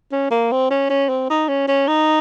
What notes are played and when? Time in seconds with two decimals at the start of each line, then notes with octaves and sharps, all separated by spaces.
0.12 C#4
0.31 A#3
0.52 C4
0.70 C#4
0.90 C#4
1.09 C4
1.30 D#4
1.49 C#4
1.68 C#4
1.88 D#4